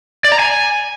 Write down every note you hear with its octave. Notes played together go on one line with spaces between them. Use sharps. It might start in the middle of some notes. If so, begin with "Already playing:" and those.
D5
A#5
G#5